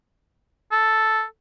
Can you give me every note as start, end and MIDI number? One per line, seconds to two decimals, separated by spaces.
0.71 1.23 69